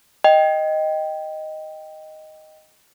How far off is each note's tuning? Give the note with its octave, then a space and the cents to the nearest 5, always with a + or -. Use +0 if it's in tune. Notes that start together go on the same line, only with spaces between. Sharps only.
D#5 +0 G5 +0